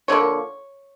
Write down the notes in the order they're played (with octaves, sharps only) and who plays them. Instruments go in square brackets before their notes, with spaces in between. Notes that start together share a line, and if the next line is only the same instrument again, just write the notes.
[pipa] D3 F3 A#3 C#5